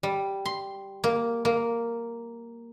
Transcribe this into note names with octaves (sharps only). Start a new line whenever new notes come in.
G3
C6
A#3
A#3